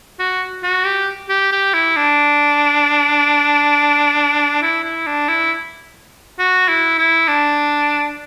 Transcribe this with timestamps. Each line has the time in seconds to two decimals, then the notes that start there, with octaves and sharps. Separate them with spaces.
0.20 F#4
0.64 F#4
0.85 G4
1.29 G4
1.52 G4
1.74 E4
1.96 D4
4.62 E4
4.84 E4
5.07 D4
5.29 E4
6.39 F#4
6.68 E4
6.98 E4
7.28 D4